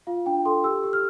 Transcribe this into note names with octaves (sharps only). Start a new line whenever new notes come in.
F4 F5
D4 G5
A4 C6
G4 E6
G4
F6